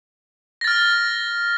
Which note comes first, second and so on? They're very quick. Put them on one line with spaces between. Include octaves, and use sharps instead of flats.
A#6 A6 F6